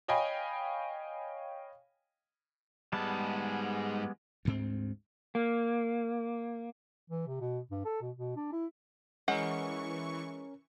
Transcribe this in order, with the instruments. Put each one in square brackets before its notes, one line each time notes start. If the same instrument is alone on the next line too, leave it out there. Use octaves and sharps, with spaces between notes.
[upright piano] C#5 D#5 F5 G5 G#5 B5
[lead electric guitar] G#2 A5 [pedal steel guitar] G3 G#3 B3
[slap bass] D2 G#2 C4
[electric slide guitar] A#3
[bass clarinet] E3
C3
B2
G2
A4
B2
B2
D4
E4
[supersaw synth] E3 C#6 [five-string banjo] G#3 F#5 [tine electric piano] C#4 A#4